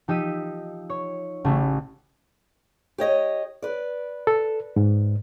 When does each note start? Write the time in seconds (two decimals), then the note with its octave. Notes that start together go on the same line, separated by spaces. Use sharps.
0.08 F3 D#4 G4 E6 B6 D#7
0.90 C#5
1.44 A1 A2 C#3 A3
2.98 G4 C#5 D#5
3.62 B4 D5
4.27 A4
4.76 G#2